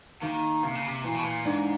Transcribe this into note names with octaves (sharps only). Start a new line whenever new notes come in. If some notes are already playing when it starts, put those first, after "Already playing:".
D#3 A#3
C3 A#3
C#3
C3
A#2 E3
B2
A#2
G#2 D4